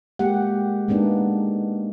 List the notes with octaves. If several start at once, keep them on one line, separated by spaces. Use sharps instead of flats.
G#3 A#3 G4 F#5
G#3 A#3 B3 D4 D#4